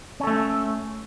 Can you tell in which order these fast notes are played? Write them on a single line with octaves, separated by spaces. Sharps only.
C#4 A4 A3